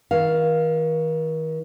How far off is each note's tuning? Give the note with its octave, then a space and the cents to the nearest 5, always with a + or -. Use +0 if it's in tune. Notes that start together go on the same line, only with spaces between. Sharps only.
D#3 +40 F5 +0